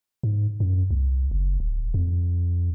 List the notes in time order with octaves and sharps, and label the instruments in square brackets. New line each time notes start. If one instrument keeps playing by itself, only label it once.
[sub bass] G#2
F#2
C2
F#1
D1
F2